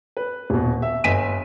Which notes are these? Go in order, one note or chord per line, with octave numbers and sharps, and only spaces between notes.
B4
D#1 B2
E5
G1 D#5 G#5 B6 D#7 E7